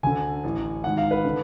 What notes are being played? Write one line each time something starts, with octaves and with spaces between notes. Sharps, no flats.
D2 D3 G#5
A1 A2
G#1 G#2 F#5
F5
B4
D3